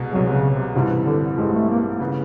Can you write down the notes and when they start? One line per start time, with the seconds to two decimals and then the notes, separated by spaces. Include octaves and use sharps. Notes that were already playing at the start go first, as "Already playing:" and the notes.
Already playing: C2 B2 G#3
0.11 C2 B2 F#3 G#3
0.28 C3
0.33 C#3
0.53 C3
0.74 A1 G2 C3 E3 G3 C4
1.06 D3
1.37 A1 G2 E3 G3 G#3 C4
1.53 A3
1.69 A#3
2.00 C#3 E3 G#3 B3